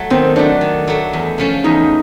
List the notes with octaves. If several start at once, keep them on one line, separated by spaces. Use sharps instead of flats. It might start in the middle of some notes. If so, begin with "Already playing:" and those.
Already playing: F#3 A3
D#3 C4
F#3 A3 D4
D#3
F#3 A3
E2
C#3 F3 A3 C#4
E2 D#4